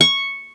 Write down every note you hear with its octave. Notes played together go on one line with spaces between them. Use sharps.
C#6